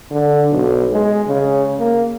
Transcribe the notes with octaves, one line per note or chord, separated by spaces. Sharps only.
D3
B1
G#3
C#3
A#3